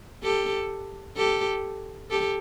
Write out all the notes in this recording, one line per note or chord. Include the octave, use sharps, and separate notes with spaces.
G4 A4
G4 A4
G4 A4